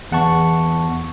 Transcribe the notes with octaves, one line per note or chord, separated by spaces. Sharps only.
E2 F#5 A5 C#6